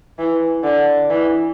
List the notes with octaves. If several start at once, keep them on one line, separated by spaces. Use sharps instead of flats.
E3
D3
E3